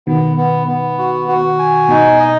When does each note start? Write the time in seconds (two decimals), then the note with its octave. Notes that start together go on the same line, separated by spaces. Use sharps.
0.07 B2 D#3 B3
0.37 B3
0.67 B3
0.98 F#4
1.28 F#4
1.59 G#5
1.89 B2 D#4
2.19 D#5